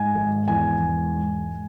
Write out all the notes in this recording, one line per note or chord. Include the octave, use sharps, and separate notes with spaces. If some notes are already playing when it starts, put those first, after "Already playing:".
Already playing: G#2 G#5
G#1
E2 G#5
E1
G#2